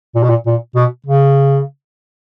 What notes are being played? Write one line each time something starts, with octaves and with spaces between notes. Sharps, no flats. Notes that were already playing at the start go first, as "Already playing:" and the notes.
A#2
B2
A#2
A#2
B2
C#3